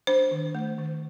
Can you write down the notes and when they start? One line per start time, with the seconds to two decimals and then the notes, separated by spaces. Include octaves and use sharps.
0.07 D4 C5
0.31 D#3
0.55 A3
0.78 D#3